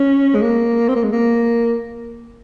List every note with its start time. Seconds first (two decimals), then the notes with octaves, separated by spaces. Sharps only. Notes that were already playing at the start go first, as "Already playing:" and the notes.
Already playing: C#4
0.35 G#3
0.42 A#3
0.88 C4
0.95 A#3
1.04 G#3
1.12 A#3